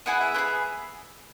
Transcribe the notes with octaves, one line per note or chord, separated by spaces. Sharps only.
B3 E4 G#4 F#5
E5
B3 E4 G#4